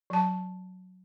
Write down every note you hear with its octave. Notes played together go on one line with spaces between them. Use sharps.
F#3 A5